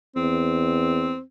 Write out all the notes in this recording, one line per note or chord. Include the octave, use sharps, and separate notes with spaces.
E2 C4